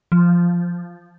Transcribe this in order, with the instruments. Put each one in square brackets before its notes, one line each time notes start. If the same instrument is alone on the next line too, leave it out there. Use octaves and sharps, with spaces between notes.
[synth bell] F3